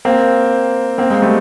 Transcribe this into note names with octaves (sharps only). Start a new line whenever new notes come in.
A#3 C4
A#3 C4
G#3 A#3
G3 A3